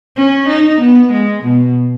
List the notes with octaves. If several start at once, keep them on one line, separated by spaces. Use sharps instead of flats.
C#4
D#4
B3
G#3
B2